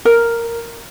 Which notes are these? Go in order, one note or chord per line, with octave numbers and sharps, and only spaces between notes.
A#4